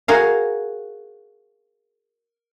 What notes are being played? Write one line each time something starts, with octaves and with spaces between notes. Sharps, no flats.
F#4 G#4 A#4 F5